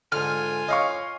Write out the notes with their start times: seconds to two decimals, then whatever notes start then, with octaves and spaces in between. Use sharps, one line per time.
0.12 G#2 D3 F4 G#5 F6
0.68 C#4 D#5 F5 C#6